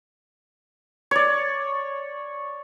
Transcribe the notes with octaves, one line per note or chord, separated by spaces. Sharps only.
C#5 D5